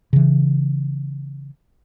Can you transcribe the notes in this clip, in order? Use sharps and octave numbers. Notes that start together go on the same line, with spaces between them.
C#3 E3